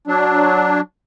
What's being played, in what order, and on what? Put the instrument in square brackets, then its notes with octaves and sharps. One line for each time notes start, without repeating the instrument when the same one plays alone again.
[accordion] F#3 D4